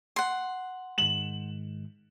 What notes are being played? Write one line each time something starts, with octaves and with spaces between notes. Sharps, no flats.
F#5 C6
G#2 D#3 G#3 E7 F#7